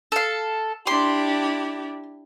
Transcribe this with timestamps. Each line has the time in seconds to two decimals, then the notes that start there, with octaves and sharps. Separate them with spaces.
0.12 A4 F5
0.87 D4 E4 G4 C6